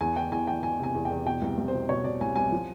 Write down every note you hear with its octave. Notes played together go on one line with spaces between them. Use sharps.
E2 G#5
E3 G5
E2 G#5
E3 G5
E3 G#5
C3 G#5
E2
G5
E2
B2 G5
C2
C2
C5
B2
B2 C#5
B2 D5
C2 G#5
C2 G#5
F3